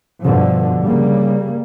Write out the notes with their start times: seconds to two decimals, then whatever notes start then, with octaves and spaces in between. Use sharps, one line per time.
0.22 G2 B2 D3 F3
0.84 C#3 G3 A#3